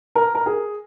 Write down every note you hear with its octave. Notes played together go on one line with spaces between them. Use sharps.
A#4
A#4
G#4